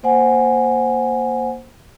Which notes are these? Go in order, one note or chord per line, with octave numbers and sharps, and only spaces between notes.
A#3 C5 F#5 G#5